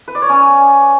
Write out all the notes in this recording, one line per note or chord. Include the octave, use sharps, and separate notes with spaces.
B4
D5
C#5
C#4